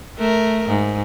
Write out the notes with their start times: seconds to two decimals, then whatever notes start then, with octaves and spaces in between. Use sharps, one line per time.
0.18 A3 A#4
0.69 G#2